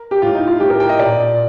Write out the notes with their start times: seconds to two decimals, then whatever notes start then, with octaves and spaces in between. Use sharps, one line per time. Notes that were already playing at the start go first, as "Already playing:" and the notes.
Already playing: A#4
0.11 G4
0.22 A2 F4
0.35 D#4
0.47 F4
0.60 A2 G4
0.70 A#4
0.80 G5
0.89 D#5
0.99 A#2 D5